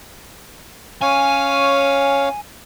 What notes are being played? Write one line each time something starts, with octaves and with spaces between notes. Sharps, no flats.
C#4 C#5 F5 G#5